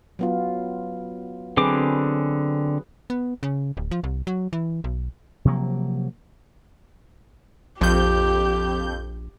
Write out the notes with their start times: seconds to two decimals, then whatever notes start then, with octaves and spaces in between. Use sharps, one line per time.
0.19 F#3 B3 F4
1.57 D3 F#3 C4 G#4 B4 D6
3.10 B3
3.43 C#3
3.77 D1
3.91 F3
4.04 C2
4.27 F#3
4.53 E3
4.84 B1
5.45 C3 F3 F#3 A#3
7.81 A#1 F2 G4 G6